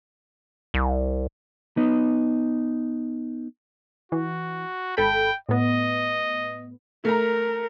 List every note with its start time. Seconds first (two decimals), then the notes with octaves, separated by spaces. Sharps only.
0.74 C2
1.77 B3 D#4
4.12 E3 F#4
4.97 G#1 A4 G5 B5
5.49 A2 B3 D#5
7.05 A3 A#4 A#5